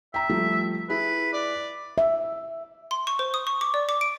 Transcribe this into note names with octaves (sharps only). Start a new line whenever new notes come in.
E5 G5 A#5
F3 G3 A3
E4 G#4 B4
D5
E5
C6
C#6
C5
D#6
C#6
D6
D5
D6
D7